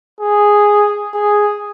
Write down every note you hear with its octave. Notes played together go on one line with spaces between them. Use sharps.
G#4
G#4